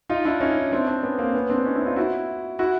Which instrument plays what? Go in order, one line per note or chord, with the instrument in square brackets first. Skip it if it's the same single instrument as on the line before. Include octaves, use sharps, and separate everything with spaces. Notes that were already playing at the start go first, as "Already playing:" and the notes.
[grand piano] D#4 F4
D4 E4
C#4 D#4
C4 D4
C4 D4
B3 C#4
A#3 C4
B3 C#4
C4 D4
C#4 D#4
D4 E4
D#4 F4
E4 F#4
E4 F#4